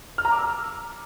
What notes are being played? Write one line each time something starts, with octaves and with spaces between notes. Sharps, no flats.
F6
A#5
D6
E6